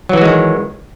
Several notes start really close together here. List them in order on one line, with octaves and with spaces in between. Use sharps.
F#3 E3 F#4 G#3 D#3